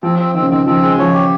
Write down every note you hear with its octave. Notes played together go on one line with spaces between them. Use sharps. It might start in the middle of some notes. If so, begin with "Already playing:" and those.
F3 C4
C4
D#3 C4
C#3
D#3 C4
F3 C4
G#3
F3 C#5
G4